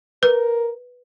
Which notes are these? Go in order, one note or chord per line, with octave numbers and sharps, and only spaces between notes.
A#4 B4